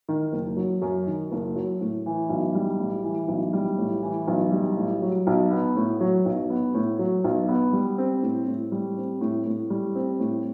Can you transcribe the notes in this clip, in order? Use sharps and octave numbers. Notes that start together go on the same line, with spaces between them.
D#3
F#1
F#3
F#2
D#3
F#1
F#3
A2
E3
B1
G3
A2
E3
B1
G3
A2
E3
B1
G3
A2
F#3
B1
B3
A2
F#3
B1
B3
A2
F#3
B1
B3
G3
C4
A2
A2
G3
C4
A2
A2
G3
C4
A2